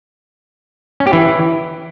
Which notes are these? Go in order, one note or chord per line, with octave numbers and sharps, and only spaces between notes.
C#4
G4
E3